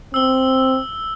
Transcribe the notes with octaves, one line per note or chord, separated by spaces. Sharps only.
C4 E6 G7